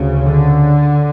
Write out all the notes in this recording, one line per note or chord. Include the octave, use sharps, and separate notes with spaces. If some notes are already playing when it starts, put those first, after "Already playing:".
Already playing: D2 C#3
D3